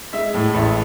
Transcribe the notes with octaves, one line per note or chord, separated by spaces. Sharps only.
G#3 E5
A2
A1